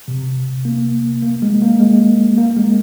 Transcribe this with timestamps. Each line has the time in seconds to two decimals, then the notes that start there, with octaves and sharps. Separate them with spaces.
0.08 C3
0.65 A#3
1.22 A#3
1.42 G#3
1.62 A#3
1.80 G#3
2.38 A#3
2.57 G#3